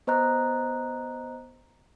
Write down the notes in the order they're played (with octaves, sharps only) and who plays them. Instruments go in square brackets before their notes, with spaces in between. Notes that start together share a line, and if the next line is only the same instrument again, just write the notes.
[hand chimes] B3 C5 D#5 A#5 F#6